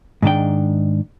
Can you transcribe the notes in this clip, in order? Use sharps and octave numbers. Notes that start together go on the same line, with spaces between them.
G#2 D#3 D4 G5